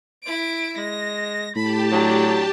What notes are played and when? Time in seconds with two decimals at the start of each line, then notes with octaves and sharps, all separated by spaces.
0.23 E4 D7
0.77 G#3 A#6
1.56 A2 G4 A5 B5
1.92 F#3 D4